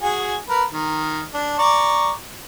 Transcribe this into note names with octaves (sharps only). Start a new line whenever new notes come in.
F#4 G#4 G#5
A#4 B4
D#3
D4
D5 A#5 C#6